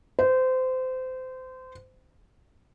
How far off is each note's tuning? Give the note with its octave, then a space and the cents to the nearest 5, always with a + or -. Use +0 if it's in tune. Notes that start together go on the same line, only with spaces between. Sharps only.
C5 -25